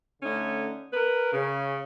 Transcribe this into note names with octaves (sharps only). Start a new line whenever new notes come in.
D3 A3 C#4 D#4
A#4 B4
C#3